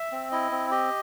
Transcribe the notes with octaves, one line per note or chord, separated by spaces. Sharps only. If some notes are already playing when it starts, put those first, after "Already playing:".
Already playing: E5
C4
E4 D#5
C4
G4 D#5